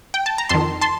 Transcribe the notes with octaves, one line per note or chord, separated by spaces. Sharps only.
G5
A5
A#5
F2 D#3 A5 C6
A5 C6